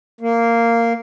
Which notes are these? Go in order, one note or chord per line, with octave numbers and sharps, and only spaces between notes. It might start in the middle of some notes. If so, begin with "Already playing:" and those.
A#3